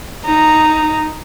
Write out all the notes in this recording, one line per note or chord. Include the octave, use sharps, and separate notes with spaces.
D#4 A#5